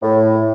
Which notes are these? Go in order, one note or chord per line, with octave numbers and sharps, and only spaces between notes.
A2